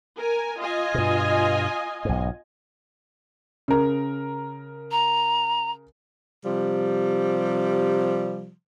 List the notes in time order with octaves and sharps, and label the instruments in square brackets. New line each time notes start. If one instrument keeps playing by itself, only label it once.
[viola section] A#4 G#5
F4 D#5 G#5
[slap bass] G2 B2
B1 G#2
[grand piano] C#3 A#4
[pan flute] A#5
[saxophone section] C3 F3 G3